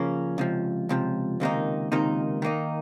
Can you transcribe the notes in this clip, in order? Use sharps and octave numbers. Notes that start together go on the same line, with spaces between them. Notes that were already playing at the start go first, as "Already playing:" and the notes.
Already playing: C#3 F3 A#3 C#4
C#2 C3 F3
C#2 C3 F3
C#2 C3 D#3 A#3 D#4
C#2 C3 D#3 A#3 D#4
D#3 A#3 D#4